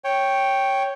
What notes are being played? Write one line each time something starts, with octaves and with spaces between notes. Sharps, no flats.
C#5 G5